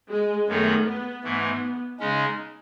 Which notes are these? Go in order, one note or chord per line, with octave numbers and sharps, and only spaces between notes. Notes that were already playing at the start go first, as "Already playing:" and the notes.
G#3
F#2 D#3 F#3 A3 B3 D#4
B3
G#2 E3 A3 B3
C#3 G#3 C#4 D#4